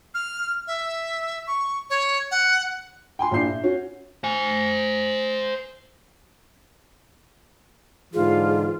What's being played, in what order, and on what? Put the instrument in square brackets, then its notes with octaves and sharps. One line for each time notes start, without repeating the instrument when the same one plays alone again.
[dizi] F6
E5
C#6
C#5
F#5
[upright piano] G5 G#5 C6
A#1 A#2 D4 E4 G6 C7
E5
C#4 F#4
[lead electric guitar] C5 G#5
[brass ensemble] G#2 D3 E3 [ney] F4 [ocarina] G#4